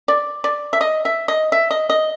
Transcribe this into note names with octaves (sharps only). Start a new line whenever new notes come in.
D5
D5
E5
D#5
E5
D#5
E5
D#5
D#5